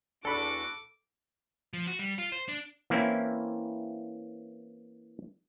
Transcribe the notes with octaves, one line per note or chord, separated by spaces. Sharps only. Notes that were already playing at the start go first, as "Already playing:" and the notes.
E2 D4 F#4 A4 B5 D6
F3
F#4
G3
F4
C5
D4
E3 A#3 C4 C#4 E4